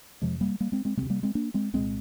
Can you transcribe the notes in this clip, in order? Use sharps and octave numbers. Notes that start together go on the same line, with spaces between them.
F2 C3 F3 G#3
G3 A#3
G3 A#3
G#3 C4
G#3 C4
D2 C3 G#3 C4
G3 A#3
G#3 C4
A#3 D4
G#3 C4
C2 A#2 G#3 C4